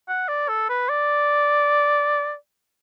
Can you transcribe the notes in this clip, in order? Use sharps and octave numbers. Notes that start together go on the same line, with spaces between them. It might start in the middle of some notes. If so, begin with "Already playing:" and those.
F#5
D5
A4
B4
D5